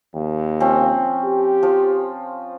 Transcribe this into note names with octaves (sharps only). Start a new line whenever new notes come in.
D#2
F3 C4 C#4
G4
F3